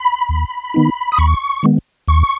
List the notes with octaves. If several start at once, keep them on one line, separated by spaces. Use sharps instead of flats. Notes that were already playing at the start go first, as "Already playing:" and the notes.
Already playing: B5
D#2
D#3 B3 D#4
D#6
D#2 C#6
D#3 G#3 B3
D#2 C#6